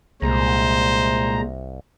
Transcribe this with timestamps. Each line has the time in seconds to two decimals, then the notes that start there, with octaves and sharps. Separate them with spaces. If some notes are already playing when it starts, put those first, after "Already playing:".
0.22 C2 A#2 G#3 C5 A#5